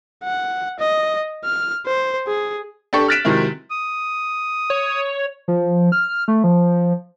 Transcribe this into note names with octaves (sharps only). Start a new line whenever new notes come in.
F#5
D#5
F6
C5
G#4
D4 G4 A4 C#6
F6 F#6 A6 B6 D7 E7
C3 D#3 F#3 G#3 E4
D#6
C#5
F3
F6
A3
F3